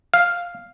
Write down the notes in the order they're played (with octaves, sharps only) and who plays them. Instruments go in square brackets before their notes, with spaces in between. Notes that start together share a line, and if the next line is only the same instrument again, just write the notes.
[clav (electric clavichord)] F5